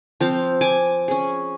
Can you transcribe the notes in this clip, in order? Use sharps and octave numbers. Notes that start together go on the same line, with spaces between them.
F3 C4 F5
G#5 D6
C#4 G#4